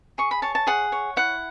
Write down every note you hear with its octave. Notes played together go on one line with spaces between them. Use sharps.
G#4 C#6
B5
C#5 A5
A5
G#4 F#5
C#5
E4 F#5